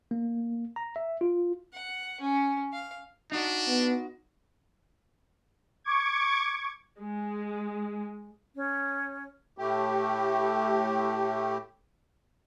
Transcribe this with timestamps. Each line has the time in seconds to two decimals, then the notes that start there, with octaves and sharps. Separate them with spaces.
0.11 A#3
0.76 A#5
0.96 E5
1.21 F4
1.73 F#5
2.20 C#4
2.73 F5
3.32 D4 D#4 F#4
3.67 B3
5.84 C#6 D6 G#6
6.99 G#3
8.56 C#4
9.58 A2 A3 G4